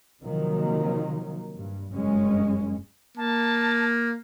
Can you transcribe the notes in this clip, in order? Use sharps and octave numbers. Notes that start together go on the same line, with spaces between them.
C3 D#3 F3 F#3 A#3
G2
F#1 G2 G#3 C#4
A#3 A5